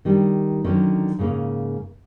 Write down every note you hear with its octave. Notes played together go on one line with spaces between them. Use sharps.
D#3 G3 D4
D3 D#3 F#3 C#4
G#2 C#3 A#3